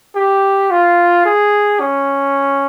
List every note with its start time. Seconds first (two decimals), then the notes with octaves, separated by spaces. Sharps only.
0.16 G4
0.71 F4
1.26 G#4
1.80 C#4